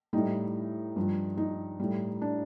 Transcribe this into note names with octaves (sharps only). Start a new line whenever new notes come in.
A2 G3 D#4
G2 F3
D#4
A2 G3
D4